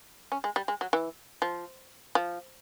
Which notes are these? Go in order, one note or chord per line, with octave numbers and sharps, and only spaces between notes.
C#4
G#3
G3
G#3
F#3
E3
F3
F3